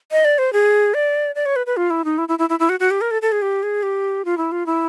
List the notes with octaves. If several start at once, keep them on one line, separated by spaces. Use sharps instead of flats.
D#5
D5
C5
G#4
D5
D5
C#5
B4
B4
F4
E4
D#4
E4
E4
E4
E4
E4
F#4
F#4
G4
A#4
A4
A4
G#4
G4
G#4
G4
F4
E4
F4
E4